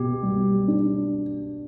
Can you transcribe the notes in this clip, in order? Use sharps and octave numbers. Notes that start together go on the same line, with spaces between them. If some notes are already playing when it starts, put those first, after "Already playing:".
Already playing: B2 G4
G3
D4